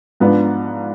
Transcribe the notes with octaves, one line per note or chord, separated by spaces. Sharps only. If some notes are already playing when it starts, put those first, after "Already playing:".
G#2 F3 B3 D4 F4